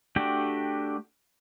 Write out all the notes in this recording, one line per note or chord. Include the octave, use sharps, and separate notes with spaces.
A3 D4 F#4 G4 G5